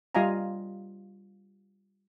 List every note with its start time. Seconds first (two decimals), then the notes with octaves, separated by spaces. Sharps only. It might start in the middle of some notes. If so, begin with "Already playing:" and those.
0.15 G3 F4 D#5 F5 G#5 A#5